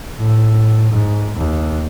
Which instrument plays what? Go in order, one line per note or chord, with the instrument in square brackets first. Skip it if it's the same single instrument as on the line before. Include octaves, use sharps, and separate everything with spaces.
[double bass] A2
G#2
D#2